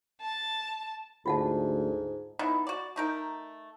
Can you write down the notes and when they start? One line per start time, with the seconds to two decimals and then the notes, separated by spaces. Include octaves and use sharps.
0.21 A5
1.26 D2 G#2 F4 F#5 A5
2.39 B3 D#4 E4
2.67 F#4 D5
2.96 A3 D#4 A#4